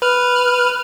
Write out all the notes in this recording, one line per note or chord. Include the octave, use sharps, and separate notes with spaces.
B4 F6